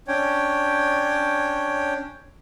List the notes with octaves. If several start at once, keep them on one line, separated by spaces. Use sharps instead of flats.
C#4 D4 C#5 G5